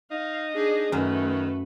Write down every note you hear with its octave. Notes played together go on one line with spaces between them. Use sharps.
D#4 F5
D4 G#4
F#2 D#3 A3 B4